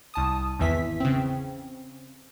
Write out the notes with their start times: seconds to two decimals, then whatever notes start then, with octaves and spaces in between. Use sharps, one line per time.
0.14 C2 A5 D#6
0.59 G#1 E2 E3 E5 B6
1.00 C#3 C4